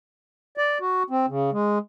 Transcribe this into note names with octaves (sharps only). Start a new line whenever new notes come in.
D5
F#4
C4
C#3
G#3